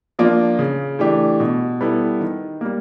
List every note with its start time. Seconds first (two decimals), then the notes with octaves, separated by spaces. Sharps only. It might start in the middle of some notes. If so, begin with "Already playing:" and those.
0.19 F3 A#3 D4 F4
0.59 C#3
0.99 E3 A3 D4 G4
1.40 B2
1.81 G3 B3 E4 A4
2.20 D#3
2.61 G3 A#3